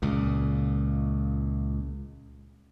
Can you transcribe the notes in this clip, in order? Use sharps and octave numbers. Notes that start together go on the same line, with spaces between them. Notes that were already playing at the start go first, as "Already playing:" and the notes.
C#2 A#2